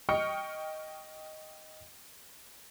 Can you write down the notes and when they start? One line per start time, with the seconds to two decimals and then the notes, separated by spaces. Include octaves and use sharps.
0.09 D#5 G5 C#6 F6 C#7